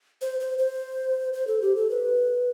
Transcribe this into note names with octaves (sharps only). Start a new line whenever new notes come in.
C5
C5
C5
C5
A4
G4
A4
B4